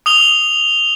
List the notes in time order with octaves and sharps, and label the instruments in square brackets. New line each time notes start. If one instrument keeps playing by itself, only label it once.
[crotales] D#6 F7 G7